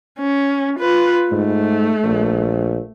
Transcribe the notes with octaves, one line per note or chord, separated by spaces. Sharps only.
C#4
F4 B4
G#2 A3
A#1